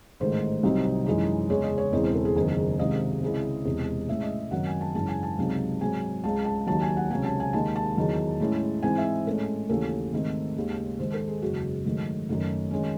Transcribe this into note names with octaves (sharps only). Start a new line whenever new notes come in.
A1 G#2 D#3 A3 C5
C2 C3 F#3 C4 D#4
F#2 E3 G#3 D#4
E2 C#3 G#3 C#5
D#5
C#5
E1 E2 C#3 E3 C4 D#5
C5
A4
G#4
F#1 E2 D#3
C#2 C3 D#3 D#5
C#2 C#3 G#3 C4 E4
E1 E2 C3
A2 G#3 C#4 E5
D#5
F#2 D#3 F#3 C4 D#4 F#5
G#5
A5
G#1 F#2 C#3 E3 A5
G#5
A5
C#2 C3 F#3 C4 D#4
G#2 F#3 C4 G#5
C#2 C#3 G#3 A5
A5
D#2 D#3 F#3 A5
G#5
F#5
C#2 C3 F#3 C#4 G#5
A5
G#5
D#2 D#3 G#3 A5
A5
E2 D#3 F#3
A2 G#3 C#4 E4
G#2 E3 C4 D#4 G#5
E5
A2 G#3 C#4 A4
D#2 C#3 E3 A3 C#4 A4
G#2 D#3 A3 C4
D#2 C#3 G#3
G#2 D#3 G#3 C5
A4
G#4
F#1 E2 C#3 G#3 F#4
G#2 D#3 F#3 A3
F#2 D#3 A3
D#3 G#3 C#4